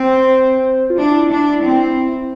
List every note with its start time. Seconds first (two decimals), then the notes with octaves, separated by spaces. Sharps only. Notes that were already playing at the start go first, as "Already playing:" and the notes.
Already playing: C4 C5
0.90 F4
0.98 D4 E4
1.31 D4
1.63 C4